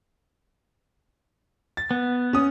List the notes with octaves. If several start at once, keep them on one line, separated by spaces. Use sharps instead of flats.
A6
B3
C#4 D#6